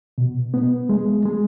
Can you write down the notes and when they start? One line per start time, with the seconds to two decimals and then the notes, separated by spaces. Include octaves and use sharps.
0.18 B2
0.54 B3
0.89 G#3
1.26 G#3